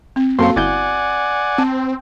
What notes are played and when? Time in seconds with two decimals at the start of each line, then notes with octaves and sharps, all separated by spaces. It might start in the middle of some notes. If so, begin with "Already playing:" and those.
0.16 C4
0.39 F#2 A#3 C4 F#4 A4 F5 C6
0.56 G1 E4 D5 F#5 G#5 G6
1.58 C4 A5